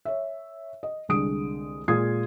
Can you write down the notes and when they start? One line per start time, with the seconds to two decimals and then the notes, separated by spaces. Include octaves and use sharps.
0.05 C#5 E5
0.83 D#5
1.09 C2 D3 G#3 D#6 D7
1.88 A#2 G#3 F4 D#6 G#6 C7